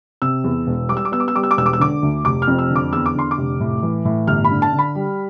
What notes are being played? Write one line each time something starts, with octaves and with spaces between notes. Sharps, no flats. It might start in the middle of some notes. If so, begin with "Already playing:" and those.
C3 E6
E2
E1
G3 D6
E6
D6
B3 E6
D6
E6
G3 D6
E6
D6
E1 E6
D6
E6
D3 D6
D2
F1 D6
F6
F2
E6
D3
D6
E2 E6
D6
D3 C6
D6
F1
A2
E3
A2
G1 F6
B5
D3
A5
D3
B5
G3